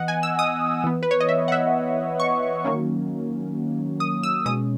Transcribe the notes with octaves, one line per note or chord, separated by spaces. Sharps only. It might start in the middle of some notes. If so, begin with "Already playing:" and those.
Already playing: E3 B3 D#5 F#5
G#5
E6
D#6
E3 B3
B4
C#5
D#5
E5
F#5
E5
C#6
D#3 F#3 A#3 C#4
D#6
E6
B2 G#3 C#4 D#6